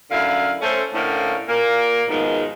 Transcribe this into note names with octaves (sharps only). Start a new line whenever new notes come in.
F#2 D3 E4 F5
A3 C#4 A4 C5
A2 D3 F3 A#3 C#4
A#2 A#3
G#2 B2 D#3 F3 G#3